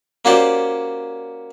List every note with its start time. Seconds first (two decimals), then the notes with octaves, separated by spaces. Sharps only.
0.25 A#3 C#4 F#4 G4 C5 D5